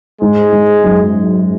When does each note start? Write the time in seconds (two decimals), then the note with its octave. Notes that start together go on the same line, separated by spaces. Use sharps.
0.21 G#2 G#3
0.52 G#2
0.84 F#2